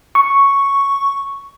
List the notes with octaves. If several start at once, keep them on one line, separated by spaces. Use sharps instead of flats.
C#6